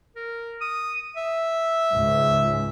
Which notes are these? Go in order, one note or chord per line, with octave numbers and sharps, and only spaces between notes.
A#4
D#6
E5
C#2 G#2